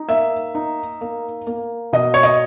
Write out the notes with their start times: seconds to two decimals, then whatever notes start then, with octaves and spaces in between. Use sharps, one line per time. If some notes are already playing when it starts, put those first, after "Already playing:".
Already playing: D#4
0.09 A#3 E5
0.55 D#4
1.01 A#3
1.47 A#3
1.93 B2 D#5
2.14 C#5
2.23 D#5